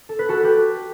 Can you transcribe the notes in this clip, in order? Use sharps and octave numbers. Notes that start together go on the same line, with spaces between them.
A4
B4
F#4 A4
G4 B4